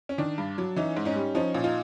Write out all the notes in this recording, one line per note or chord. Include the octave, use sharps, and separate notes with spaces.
C#4
D#3 D4
G2
F#3
E3 C#4 D#4
G#2
C#4 D#4
G3
F3 C#4 D#4
A#2
D#4 F4